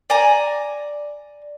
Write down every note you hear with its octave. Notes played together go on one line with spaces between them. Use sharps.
D5 G#5 A#5